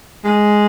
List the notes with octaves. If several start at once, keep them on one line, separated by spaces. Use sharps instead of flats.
G#3